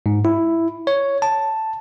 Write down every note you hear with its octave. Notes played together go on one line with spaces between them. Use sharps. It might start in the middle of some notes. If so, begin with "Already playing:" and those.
G#2
E4
C#5
A5